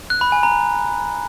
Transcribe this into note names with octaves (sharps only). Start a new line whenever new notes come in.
F#6
B5
G#5
A#5